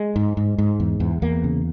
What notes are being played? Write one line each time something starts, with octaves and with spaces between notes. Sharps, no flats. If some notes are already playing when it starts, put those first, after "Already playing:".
Already playing: G#3
G#2
G#2
G#2
E2
E2
E2 A#3
C#3